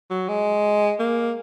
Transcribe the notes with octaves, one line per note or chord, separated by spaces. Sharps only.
F#3
G#3
A#3